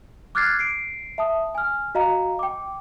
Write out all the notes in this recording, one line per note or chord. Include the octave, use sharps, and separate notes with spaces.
D6 F6 F#6 G#6 A6 C7
C7 D7
E5 A5 D#6
G#5 F6
F#4 D#5 F5 A#5
G5 D6